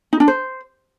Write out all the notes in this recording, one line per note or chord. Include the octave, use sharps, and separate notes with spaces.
D#4
D4
C5